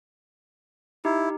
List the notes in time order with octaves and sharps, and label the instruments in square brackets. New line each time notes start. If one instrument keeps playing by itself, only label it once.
[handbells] D#4 G4 [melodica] E4